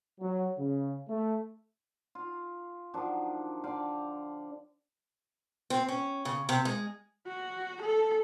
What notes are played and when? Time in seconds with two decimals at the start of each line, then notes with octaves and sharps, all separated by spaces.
0.21 F#3
0.59 C#3
1.09 A3
2.15 F4
2.94 D#3 F3 F#3 D4
3.64 D3 D5 F5 G5
5.70 C4
5.88 C#4
6.25 C#3
6.49 C3
6.65 G#3
7.27 F#4
7.81 A4